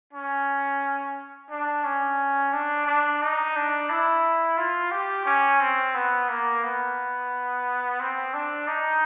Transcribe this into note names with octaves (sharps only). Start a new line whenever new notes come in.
C#4
D4
C#4
D4
D4
D#4
D4
E4
F4
G4
C#4
C4
B3
A#3
B3
C4
D4
D#4